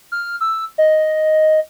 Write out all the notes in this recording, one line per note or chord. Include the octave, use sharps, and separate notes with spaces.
F6
E6
D#5